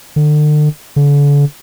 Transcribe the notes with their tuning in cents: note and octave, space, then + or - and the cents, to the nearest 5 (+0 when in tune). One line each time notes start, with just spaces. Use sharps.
D3 +35
D3 -40